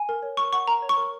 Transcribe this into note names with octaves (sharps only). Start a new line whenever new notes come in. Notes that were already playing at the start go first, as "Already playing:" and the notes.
Already playing: G#5
A#4
C#5
A#4 C#6
F#5 C#6
A#4 A#5
C#5
C#6
A#4